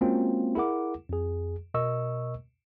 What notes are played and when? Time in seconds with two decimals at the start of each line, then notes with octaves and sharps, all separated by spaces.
0.01 G#3 A#3 C4 C#4 F4 F#4
0.55 E4 G#4 A#4 F#5 D6
1.09 F2 G#4
1.74 B2 A#4 D#5 C#6 E6